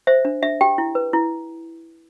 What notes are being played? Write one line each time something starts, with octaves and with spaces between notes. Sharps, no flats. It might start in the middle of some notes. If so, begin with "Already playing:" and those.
C5 E5
D4
D4 E5
G4 G5
E4
B4
E4